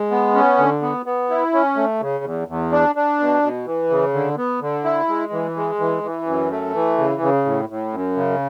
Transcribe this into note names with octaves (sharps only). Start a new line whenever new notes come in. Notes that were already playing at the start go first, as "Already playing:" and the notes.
Already playing: G#3
B3
C#4
D3
B3
B3
E4
C#4
A3
C#3
E2
E2
D4
D4
B2
B2
E3
C#3
D3
B3
D3
E4
G#3
E3
G#3
E3
E3
F#2
A3
E3
C#3
C#3
A2
A2
F#2
C#3